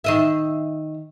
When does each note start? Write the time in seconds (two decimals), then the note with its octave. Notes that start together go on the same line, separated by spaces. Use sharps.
0.04 D#3 D#5 E5